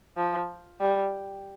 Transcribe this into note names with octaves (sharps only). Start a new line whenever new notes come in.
F3
G3